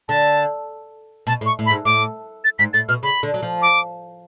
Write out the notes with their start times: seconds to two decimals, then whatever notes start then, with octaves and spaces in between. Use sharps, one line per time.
0.09 D3 A5
1.27 B2 A5
1.41 A2
1.46 C#6
1.59 A2
1.66 B5
1.71 G#2
1.85 A2 D6
2.44 A6
2.59 G#2 B6
2.73 A2 A6
2.89 B2 F6
3.03 C#3 B5
3.23 D3
3.34 F#3
3.43 F3
3.62 D6